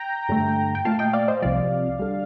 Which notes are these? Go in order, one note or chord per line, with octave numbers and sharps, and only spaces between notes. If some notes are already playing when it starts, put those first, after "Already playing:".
Already playing: G5 A#5
G2 D3 A3
G5
A#2 A3 F5 A5
D#5 G5
D5 F5
C5 D#5
C2 C3 F3 D5 F5
D3 G3